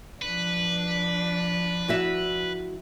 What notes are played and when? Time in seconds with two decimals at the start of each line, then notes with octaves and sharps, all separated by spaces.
0.22 F3 D4 B4
1.88 E4 F#4 E5